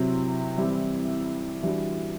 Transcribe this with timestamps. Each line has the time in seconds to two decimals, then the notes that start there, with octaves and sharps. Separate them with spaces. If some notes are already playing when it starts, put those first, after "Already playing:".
Already playing: C3 F#3 C4 E4
0.58 E3 G3 C4 E4 G4
1.63 E3 G3 D4 F#4